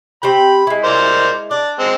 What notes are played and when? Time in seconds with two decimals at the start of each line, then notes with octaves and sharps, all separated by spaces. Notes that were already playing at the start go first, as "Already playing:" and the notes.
0.23 C4 G4 G5 B5
0.67 G#3 E4
0.84 A#4 C5 D5
1.51 D4 D5
1.79 G#3 C4